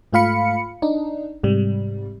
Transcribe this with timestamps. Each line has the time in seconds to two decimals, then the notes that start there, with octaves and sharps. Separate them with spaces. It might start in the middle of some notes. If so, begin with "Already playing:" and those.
0.13 G#2 A3 F4 F5 B5 C#7
0.82 D4 D#4
1.43 G#2 C3 G3